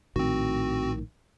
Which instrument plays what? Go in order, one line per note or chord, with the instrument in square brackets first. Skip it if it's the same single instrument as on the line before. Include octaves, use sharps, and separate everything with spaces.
[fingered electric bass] A#1 A2 D#3 [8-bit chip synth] C4 F#4